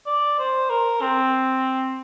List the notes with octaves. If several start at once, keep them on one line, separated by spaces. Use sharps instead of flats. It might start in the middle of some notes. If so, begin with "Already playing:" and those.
D5
C5
A#4
C4